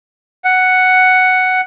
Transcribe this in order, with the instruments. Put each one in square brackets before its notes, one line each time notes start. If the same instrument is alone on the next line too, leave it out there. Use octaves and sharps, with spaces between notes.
[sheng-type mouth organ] F#5